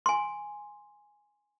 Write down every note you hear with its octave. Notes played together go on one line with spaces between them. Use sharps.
G#5 C6